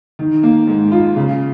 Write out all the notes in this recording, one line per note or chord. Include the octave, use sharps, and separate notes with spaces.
D#3
A#3
G#2
F4
C#3